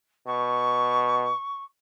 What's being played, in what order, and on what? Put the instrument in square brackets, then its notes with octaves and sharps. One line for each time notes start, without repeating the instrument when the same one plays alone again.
[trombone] B2 [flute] C#6